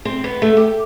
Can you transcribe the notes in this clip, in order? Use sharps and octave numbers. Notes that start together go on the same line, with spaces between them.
C4
B3
A3
G4